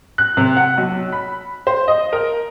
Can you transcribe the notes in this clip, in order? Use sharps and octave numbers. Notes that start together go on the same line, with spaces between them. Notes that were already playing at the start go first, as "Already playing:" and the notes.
F#6
C3
F#5
B1
B5
C5
D#5
A#4